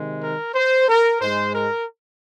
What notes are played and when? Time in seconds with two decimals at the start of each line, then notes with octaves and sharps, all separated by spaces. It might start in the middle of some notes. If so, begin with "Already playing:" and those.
Already playing: C3 D#3 G#3
0.22 A#4
0.55 C5
0.88 A#4
1.21 G#2 G#3 C5
1.55 A#4